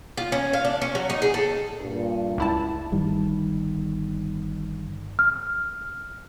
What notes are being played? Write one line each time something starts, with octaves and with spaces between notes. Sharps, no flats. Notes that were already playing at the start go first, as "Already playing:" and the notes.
F4
C#4
F5
D4
C#4
F#3
D#4
G#4
A4
G2 A#2
C#2 E4 A5
G1 D#3 G3
F6